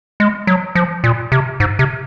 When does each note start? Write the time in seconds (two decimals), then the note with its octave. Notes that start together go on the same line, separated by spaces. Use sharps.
0.20 G#3
0.47 F#3
0.75 F3
1.04 A#2
1.32 C3
1.60 G#2
1.79 C3